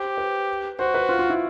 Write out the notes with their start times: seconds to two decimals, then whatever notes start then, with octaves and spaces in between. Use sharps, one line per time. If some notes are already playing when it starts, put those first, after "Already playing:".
Already playing: G4 C5
0.18 B4
0.79 F#4 C5
0.94 B4
1.09 F4
1.19 F4
1.30 E4